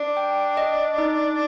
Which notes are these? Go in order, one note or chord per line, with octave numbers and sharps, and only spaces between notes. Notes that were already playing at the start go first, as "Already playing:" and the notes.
Already playing: D4
G5
D#5
D#4